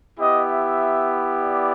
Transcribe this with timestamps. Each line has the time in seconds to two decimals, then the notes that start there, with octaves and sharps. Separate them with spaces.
0.19 B3 E4 G4 D#5
0.49 E5
1.40 D5